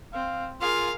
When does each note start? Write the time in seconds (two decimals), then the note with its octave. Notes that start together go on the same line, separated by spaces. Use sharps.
0.13 C4 F5
0.61 F4 G#4 A#4 F5